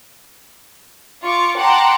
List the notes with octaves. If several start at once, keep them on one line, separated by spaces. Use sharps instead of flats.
F4 C#6 D6
F#5 G5 A5 A#5 C6 D6